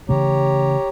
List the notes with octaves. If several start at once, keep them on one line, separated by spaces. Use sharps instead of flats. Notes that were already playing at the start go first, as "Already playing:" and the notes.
C#3 E3 A3 G4 C#5 A#5